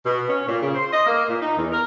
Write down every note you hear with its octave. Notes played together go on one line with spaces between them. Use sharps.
B2
C#4
A#2
C#3
C5
D#5
A#3
A#2
D#4
E2
A#4